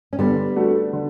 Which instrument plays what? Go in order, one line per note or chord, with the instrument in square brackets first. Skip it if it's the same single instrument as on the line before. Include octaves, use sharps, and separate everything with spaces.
[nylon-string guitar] C#4
[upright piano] D3 [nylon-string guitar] G3 B3
[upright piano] A3 D4 F#4
D3